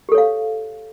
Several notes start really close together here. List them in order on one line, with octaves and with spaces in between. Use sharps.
G4 A4 C#5 F5